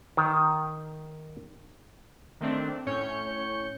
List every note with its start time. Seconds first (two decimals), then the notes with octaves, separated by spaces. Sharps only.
0.17 D#3
2.40 D#3 A3 C4 D4
2.86 A2 C#4 C#5 G6 C#7